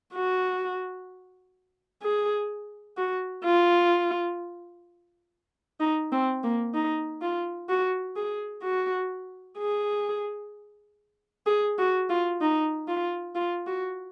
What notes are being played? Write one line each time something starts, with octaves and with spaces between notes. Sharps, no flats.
F#4
G#4
F#4
F4
D#4
C4
A#3
D#4
F4
F#4
G#4
F#4
G#4
G#4
F#4
F4
D#4
F4
F4
F#4